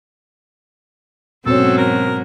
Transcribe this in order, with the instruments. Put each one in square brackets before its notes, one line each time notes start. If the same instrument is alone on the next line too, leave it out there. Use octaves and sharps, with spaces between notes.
[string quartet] G#2 F#3 [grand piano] B2 C#4 [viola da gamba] C4 [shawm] A4
[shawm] A#4